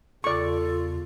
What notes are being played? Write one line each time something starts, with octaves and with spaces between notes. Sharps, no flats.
E2 C#3 F4 A4 D5 C#6